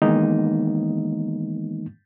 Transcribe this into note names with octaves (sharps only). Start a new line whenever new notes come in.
D#3 E3 G#3 A#3 B3 D#4